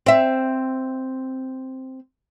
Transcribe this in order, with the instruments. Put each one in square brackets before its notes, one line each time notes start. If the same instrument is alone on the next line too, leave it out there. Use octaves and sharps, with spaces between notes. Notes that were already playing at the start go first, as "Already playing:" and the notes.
[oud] C4 E5